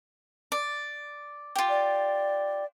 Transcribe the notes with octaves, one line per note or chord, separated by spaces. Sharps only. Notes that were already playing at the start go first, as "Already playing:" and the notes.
D5
F4 G4
D5